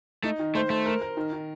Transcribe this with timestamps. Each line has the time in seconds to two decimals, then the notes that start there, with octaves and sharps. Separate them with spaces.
0.23 A3 D#4
0.39 D#3
0.55 A3 C5
0.70 A3 C5
0.86 A#4
1.01 A#4
1.17 D#3
1.33 D#3